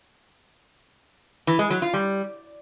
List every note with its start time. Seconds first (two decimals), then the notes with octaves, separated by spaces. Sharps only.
1.47 E3
1.59 G#3
1.70 F#3
1.82 F4
1.94 G3